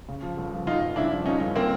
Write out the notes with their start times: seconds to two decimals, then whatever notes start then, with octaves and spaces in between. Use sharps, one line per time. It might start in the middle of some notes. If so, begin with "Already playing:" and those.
0.08 C#3
0.22 F3
0.37 G1
0.53 F3
0.66 G1 D#4 F4
0.81 G1
0.96 C#3 D4 E4
1.11 F3
1.25 G1 C#4 D#4
1.41 G1
1.56 D3 A#3 C4